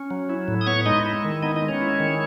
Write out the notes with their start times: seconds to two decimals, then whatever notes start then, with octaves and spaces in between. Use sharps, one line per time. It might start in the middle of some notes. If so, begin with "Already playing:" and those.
Already playing: C#4
0.10 F#3
0.29 E4
0.48 A2
0.61 D#6
0.67 B3 C#5 C#6
0.86 G#3 D#4 D#5
1.06 E4
1.25 D#3
1.43 B3 D#4 D#5
1.56 D#4 D#5
1.62 G#3
1.68 C#4 C#5
1.81 E4
2.00 D#3